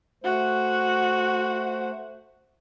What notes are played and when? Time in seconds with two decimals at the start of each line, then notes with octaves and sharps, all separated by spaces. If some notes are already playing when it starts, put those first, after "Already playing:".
0.24 A3 F#4 C5